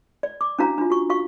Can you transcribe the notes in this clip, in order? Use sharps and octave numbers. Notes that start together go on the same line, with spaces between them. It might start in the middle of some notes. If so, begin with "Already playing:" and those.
D5
D6
C#4 D4 E4 F#4 F5 A#5
D4 F4
F#4 C#6
F#4 F5 C#6